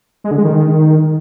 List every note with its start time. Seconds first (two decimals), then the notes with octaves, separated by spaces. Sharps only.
0.24 G#3
0.31 D3
0.38 G#3
0.45 D#3